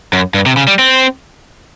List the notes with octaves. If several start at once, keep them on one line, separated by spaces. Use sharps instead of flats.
F#2
G2
C3
C#3
G3
C4